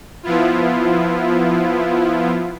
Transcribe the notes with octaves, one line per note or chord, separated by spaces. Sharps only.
F3 B3 E4 F4